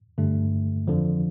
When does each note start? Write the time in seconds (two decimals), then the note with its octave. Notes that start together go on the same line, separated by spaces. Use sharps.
0.18 G2 D3 A3
0.88 F2 D3 F3